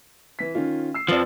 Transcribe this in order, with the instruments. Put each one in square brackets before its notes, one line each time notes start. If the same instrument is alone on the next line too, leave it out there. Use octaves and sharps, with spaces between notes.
[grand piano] E3 B6
D#3 C#4 F4
E6 C7
[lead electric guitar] F2 F3 [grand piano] B4 D5